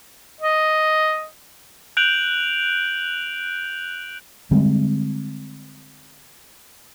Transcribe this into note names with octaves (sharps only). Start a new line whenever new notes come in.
D#5
F#6 G6 D7 F7 F#7
D3 G3 G#3 C4